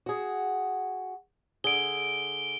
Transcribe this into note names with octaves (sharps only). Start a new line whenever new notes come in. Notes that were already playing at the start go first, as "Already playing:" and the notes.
F#4 G#4
D3 G#4 D7 G7